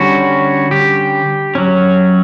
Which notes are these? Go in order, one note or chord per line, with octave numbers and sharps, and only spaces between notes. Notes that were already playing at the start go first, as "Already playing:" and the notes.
Already playing: D3 G3 C#4 F#4
G4
F#3 C#4